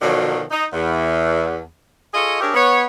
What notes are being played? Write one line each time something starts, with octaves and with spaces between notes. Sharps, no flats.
B2 D3 D#3 F3 F#3
D#4
E2
F4 G#4 A4 C#5 D#5
D4 G4 G#4 A#4 C#5 E5
B3 C#5